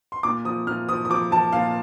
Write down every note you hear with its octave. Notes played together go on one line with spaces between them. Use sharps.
C6
A#2 D6
F3 D#6
A#2 F6
F3 D#6
D#6
F3 D6
F3 A5
A#2 F5